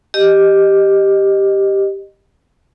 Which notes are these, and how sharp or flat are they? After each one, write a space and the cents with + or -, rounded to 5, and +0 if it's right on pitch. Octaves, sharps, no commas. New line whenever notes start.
G4 +0 D#5 -10